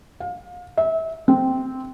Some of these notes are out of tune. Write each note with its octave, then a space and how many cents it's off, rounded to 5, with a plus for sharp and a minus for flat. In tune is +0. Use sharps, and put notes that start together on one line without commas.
F5 +30
E5 -30
C4 -10